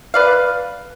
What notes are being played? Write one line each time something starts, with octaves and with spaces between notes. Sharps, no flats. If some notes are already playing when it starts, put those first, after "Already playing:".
B4 D5 F5